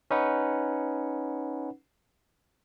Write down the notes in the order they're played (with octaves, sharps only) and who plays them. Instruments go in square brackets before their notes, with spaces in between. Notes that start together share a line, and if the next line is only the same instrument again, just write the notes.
[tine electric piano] C#4 D#4 B4 F#5